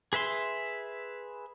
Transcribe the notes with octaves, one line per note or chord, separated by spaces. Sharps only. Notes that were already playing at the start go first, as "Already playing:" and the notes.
G#4 B4 E5 C6